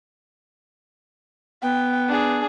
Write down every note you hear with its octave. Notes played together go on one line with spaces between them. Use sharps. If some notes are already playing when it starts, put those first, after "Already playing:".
B3 G5
D4 G#4